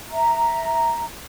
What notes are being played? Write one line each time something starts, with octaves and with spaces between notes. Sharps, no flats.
E5 A#5